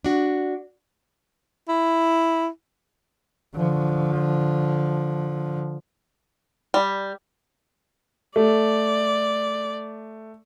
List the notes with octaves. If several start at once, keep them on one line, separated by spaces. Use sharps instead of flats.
D4 F#4
E4
D3 F3
G3
A3 D5